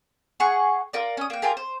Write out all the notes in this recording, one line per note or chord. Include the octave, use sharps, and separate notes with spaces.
G#4 F#5 C#6
F4 A#4 D5
C#4 D#6
A#3 G5
F4 G4 G#4 A#4
C5